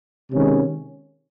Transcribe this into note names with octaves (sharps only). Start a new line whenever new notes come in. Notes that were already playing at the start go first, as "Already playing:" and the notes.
C3 D#3 G#3 C#4